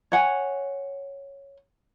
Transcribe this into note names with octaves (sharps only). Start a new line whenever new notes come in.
C#5 F#5 G#5